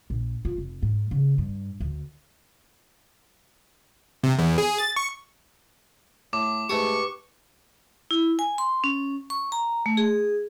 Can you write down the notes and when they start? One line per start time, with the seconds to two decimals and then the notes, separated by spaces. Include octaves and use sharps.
0.10 A#1
0.45 F4
0.58 F1
0.82 G#2
1.11 C#3
1.38 G2
1.80 D2
4.24 C3
4.39 E2
4.58 G#4
4.78 A6
4.96 C#6
6.33 A2 D6
6.69 G#2 A3 G4 B4 C#6 D#6
8.11 E4
8.39 G#5
8.58 C6
8.84 C#4
9.30 C#6
9.52 A#5
9.86 A3
9.97 G#4